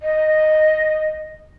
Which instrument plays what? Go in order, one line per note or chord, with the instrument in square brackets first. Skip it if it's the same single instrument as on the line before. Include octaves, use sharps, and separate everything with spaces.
[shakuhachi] D#5